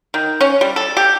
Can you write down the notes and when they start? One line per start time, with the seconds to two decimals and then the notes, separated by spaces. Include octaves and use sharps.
0.14 D#3
0.41 C#4
0.61 G3
0.76 A4
0.97 G4